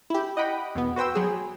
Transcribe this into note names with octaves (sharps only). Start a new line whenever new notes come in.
E4 G4
D#5 F#5 G5 B5
E2 B2 B3
F#4 B4 C5 G5 E6
F#3 G#4